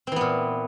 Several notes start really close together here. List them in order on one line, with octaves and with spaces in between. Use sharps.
C4 E3 B3 A#2